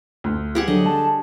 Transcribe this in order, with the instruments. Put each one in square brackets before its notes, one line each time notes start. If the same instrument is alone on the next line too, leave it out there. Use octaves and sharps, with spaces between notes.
[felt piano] D2
[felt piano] G3 [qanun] G4 G#4 F#5
[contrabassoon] D3 [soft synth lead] F#3 [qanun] D#5
[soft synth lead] A5